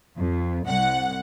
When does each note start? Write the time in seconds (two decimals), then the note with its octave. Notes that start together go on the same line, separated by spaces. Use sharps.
0.17 F2
0.66 C2 F#5